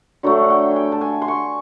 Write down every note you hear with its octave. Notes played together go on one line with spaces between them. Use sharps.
D3 F#3 A3 G5
F#5
G5
G#5
G5
A5
G#5
C6
C#6